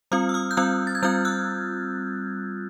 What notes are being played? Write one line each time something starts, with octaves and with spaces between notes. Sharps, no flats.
G3 C4 F4 D#6 F6
E6
D#6 F6
G6
G3 C4 F4 E6 F#6
A6
G#6
G3 C4 F4 F6 G6
E6 F#6